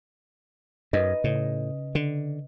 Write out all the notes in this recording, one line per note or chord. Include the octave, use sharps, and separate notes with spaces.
F#2 B4 D#5
A2 C#3
D3